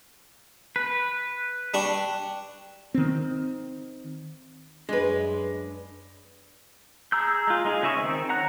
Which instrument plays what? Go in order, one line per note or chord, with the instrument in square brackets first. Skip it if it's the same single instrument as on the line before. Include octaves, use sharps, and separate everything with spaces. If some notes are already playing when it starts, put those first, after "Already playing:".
[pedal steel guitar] B4
[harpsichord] G3 D4 C#6
[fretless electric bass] D#3 C4
[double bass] F#2 [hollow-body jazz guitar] G#3 [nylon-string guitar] D4 B4
[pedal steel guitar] G#4 A#5 E6 G6
G#3 F4
G#3 D#4 G#4
C#3 G#4 D#5 E5 C#6
D#3 C4
C#4 F#5 A#5 F#6